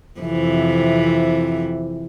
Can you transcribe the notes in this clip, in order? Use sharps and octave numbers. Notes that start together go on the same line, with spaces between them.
F2 C3 E3